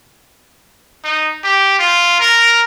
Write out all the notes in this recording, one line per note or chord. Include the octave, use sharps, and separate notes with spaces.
D#4
G4
F4
A#4